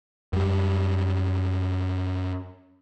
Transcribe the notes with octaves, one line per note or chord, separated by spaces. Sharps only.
F#2 G3